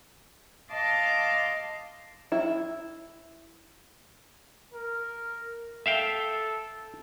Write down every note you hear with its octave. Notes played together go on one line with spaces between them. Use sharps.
D#5 F5 A5 C6 D6
E4
A#4
A4 E5 F5 G5